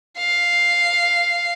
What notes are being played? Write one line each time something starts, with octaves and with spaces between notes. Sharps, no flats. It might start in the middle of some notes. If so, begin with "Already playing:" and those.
F5